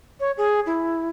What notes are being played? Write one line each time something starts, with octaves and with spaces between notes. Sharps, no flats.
C#5
G#4
E4